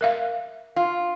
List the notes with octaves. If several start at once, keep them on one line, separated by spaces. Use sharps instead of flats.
A#4 E5 F5
F4